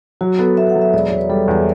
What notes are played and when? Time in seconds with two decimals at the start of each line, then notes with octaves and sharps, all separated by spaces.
0.21 F#3 F#4
0.39 B3 A4
0.57 B3 E5
0.69 F#5
0.76 F#3
0.81 E5
0.93 E1 D5
1.06 C#5
1.11 E1
1.18 B4
1.29 G3 A4
1.48 E2